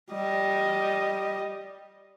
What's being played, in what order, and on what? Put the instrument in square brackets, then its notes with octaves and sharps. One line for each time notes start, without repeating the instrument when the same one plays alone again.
[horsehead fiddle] G3 D#5